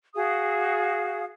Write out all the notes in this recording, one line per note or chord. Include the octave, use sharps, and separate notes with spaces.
F#4 G#4 F5 D#6